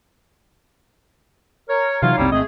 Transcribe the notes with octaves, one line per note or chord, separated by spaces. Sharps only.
A#4 C#5
C3 E3 F#3 D#4 F4 C#5 F5
F#1 C2 G3 C4
G#1 A3 C4 G#4 D#5